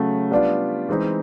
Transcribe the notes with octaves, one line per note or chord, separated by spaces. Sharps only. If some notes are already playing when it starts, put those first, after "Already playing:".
Already playing: C#3 F#3 A3
G3 B3 D4 F4
E3 G#3 C4 D#4